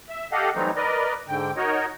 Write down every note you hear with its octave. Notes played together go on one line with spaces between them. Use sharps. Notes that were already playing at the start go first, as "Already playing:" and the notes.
E5
G4 A4 D#5 F5 F#5
E3 F#3 G3 A3 C4 D#4
A#4 B4 D5 D#5
G#2 D3 G5
D#4 F#4 A#4 C#5 D#5